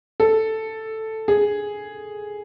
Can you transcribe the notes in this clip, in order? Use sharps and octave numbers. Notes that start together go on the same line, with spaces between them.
A4
G#4